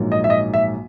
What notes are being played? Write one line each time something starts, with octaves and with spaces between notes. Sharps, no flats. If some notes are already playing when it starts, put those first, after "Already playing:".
Already playing: A#1 G#2 F#3 A#3
D#5
E5
D#5
E5